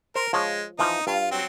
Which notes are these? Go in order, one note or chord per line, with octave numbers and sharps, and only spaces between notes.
A#4 C5
F3 G#3 C#5
E3 F3 D#4
G2 F4 F5
F#3 C4